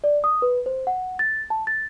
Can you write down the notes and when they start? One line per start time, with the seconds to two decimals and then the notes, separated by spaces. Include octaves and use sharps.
0.04 D5
0.24 D#6
0.42 B4
0.66 C5
0.87 F#5
1.19 A6
1.50 A5
1.67 A6